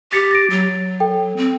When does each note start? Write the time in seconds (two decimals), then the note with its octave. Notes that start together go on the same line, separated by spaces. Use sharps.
0.13 G4 A6 B6 C#7
0.31 A6 A#6 D7
0.50 F#3
1.00 A4 G5
1.37 C4